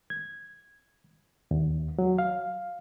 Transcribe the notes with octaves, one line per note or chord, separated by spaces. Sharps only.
G#6
D#2
F#3
F5